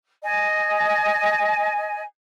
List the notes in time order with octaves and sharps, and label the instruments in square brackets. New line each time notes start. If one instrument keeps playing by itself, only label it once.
[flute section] D#5 G#5